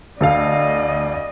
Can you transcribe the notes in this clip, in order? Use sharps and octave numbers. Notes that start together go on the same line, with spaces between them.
D2 A4 D5 D#5 F5